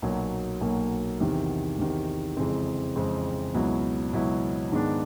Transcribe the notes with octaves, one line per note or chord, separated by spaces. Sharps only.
B1 A#2 F#3 A#3
B1 A#2 F#3 A#3
E2 C3 D#3
E2 C3 D#3
F2 C#3 E3 G#3 C4
F2 C#3 E3 G#3 C4
C#2 B2 F#3 B3 E4
C#2 B2 F#3 B3 E4
G#2 D#3 G#3 B3 D4